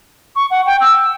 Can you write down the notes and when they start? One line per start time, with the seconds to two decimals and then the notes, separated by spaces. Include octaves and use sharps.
0.35 C#6
0.50 F#5
0.66 G5
0.80 E6